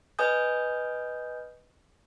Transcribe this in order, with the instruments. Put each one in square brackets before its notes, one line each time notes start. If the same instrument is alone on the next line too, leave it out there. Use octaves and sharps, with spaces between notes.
[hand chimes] B4 D#5 G#5 D#6 G6